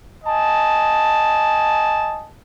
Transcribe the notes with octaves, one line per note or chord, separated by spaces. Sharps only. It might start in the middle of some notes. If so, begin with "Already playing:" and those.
D#5 G#5 A5